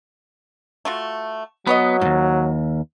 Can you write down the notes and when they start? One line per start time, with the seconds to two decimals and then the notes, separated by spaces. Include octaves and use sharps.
0.85 A3 F4 F#4
1.67 F#3 B3 B4 C#5 D#5
2.01 D#2 G#2 F3